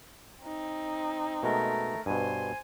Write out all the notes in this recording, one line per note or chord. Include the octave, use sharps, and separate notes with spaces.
C4 D#4
B2 G#3 A3 A#4
G2 B2 C5 G#5